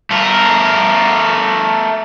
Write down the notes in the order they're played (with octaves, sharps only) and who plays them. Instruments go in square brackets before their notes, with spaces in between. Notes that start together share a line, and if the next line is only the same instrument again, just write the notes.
[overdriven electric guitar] A3 A#4